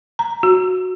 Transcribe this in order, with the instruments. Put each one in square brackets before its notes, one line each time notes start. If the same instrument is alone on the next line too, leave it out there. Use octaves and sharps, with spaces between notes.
[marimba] A#5
F#4